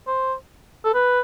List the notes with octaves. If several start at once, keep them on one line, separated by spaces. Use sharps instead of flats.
C5
A4
B4